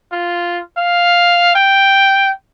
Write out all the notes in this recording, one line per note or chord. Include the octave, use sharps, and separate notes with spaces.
F4
F5
G5